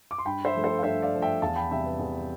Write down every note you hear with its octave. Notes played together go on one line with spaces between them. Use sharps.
D6
C6
G2 G5 B5
C5 E5
F3 A3
A4 C5
F5
G2 C5 E5
D5 F5
F3 A3
E5 G5
E2 F5 A5
G5 B5
C3 G3 E5 G5
B4
E2